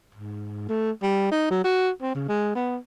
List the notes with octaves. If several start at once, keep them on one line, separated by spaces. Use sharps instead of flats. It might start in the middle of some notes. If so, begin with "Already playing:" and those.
G#2
A3
G3
D#4
F#3
F#4
C4
C#3
G#3
B3